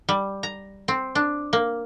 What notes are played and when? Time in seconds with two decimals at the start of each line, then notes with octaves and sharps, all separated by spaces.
0.09 G3
0.43 A#5
0.88 C4
1.15 D4
1.53 A#3